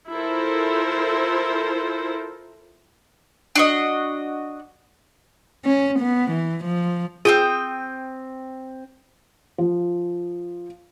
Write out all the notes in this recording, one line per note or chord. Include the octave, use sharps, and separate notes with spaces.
E4 F4 A4 A#4 C5
D4 F#4 D#5
C#4
B3
E3
F3
C4 F4 G#4 G5 D#6
F3